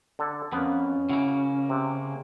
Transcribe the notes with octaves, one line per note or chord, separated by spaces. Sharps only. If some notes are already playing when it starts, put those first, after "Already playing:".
D3 A4
F2 A#3 B3 C#4
C#3 A#3 E4 F#4
C3